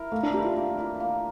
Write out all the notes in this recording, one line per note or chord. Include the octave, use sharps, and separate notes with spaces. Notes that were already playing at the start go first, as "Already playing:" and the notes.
Already playing: E4 A#4
A3 A#3
D4
E4 G4 A#4
F4
A#3
E4 A#4
A#3